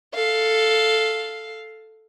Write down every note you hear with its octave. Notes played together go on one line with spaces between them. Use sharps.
A4 F5